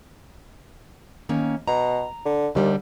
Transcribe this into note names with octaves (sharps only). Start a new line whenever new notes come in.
D#3 A#3 C#4
B2 A#5
D3
D#2 D3 G3 D4